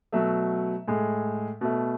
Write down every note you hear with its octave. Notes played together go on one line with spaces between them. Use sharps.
B2 F#3 A3 E5
A2 G#3
B2 A3